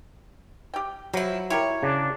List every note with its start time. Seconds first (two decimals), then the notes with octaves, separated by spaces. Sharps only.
0.74 G4 G5
1.14 F3 F#3 E4
1.50 E4 G4 A#4 C#5
1.83 C#3 D4